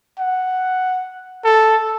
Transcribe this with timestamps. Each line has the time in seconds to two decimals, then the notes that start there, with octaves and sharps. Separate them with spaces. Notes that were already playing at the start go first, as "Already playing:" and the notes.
0.19 F#5
1.45 A4